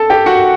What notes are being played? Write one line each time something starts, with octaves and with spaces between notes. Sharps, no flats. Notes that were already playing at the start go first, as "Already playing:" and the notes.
Already playing: A4 A5
G4 G5
F#4 F#5